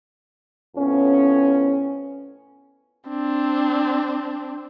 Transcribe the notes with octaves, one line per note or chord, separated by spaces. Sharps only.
F2 A2 B3 C#4
C4 D4